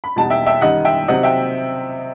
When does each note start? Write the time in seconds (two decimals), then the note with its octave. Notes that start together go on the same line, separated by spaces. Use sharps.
0.04 B5
0.16 E2 B2 G3 D#4 A5
0.30 E5 G5
0.47 E5 G5
0.61 F#2 D#3 G3 D#4 D#5 F#5
0.85 E5 G5
1.08 C3 F#3 C4 D#4 D#5 F#5
1.23 E5 G5